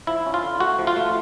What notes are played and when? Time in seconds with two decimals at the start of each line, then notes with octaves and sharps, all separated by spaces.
0.07 F3 E4
0.26 C#4
0.34 F4
0.43 D3
0.60 A3 F#4
0.78 F3
0.87 F4
0.96 A3